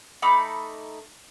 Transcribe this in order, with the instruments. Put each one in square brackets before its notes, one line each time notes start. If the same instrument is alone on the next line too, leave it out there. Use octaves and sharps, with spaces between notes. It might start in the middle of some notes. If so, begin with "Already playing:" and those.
[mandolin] A3 D#4 B5 D6